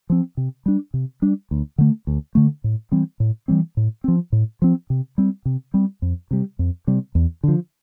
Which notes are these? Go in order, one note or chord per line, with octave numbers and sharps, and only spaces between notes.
F3 C4
C3
G3 D4
C3
G3 D4
D2
D3 A3
D2
D3 A3
A2
E3 G3 C4
A2
E3 G3 C4
A2
F3 C4
A2
F3 C4
C3
G3 C4
C3
G3 C4
F2
C3 G3
F2
C3 G3
E2
D3 F3